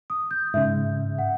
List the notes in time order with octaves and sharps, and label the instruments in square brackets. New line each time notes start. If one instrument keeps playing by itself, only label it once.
[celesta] D#6
G6
[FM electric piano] G#2 C#3 [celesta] E5
[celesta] F#5